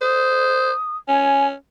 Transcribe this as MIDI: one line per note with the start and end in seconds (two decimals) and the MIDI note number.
0.01 0.72 72
0.01 0.97 87
1.08 1.53 61
1.08 1.47 80